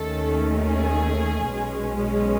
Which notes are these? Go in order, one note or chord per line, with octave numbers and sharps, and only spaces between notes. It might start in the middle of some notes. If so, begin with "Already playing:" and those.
Already playing: D#2 D#3 A3 C#4 A4
G#4
B1 B2 G#3 C#4